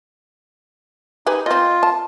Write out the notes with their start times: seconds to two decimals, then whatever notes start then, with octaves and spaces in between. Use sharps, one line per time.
1.26 D#4 G4 G#4 B4
1.46 C4 F4 D#5
1.83 A5